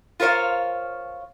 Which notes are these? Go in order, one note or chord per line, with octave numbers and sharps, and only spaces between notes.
F4 A#4 C5 C#5 F5